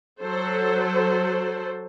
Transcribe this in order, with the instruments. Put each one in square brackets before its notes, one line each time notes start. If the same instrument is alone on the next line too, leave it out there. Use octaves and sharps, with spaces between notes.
[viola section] F#3 A4 C5